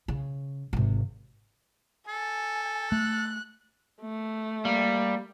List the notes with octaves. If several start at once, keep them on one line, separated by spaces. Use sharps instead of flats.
C#3
G#1 C3
A4 G#5
A3 F#6
A3
G3 A#3